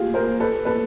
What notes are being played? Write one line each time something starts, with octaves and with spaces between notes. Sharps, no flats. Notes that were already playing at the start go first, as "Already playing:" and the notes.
Already playing: F4 G4 G#4
A#4 C5
A4 B4
A4 B4